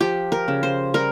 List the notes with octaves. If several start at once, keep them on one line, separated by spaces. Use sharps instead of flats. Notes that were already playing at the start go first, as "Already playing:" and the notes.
F3 G4
A#4
C#3
C5
G3 A#4